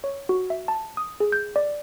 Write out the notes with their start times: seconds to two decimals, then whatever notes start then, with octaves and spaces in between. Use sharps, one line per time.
0.04 C#5
0.29 F#4
0.50 E5
0.68 A5
0.97 D#6
1.20 G#4
1.32 G6
1.56 D5